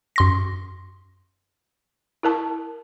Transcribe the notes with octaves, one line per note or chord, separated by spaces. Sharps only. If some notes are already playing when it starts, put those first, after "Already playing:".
F#2 C6 A#6
E4 A#4 A5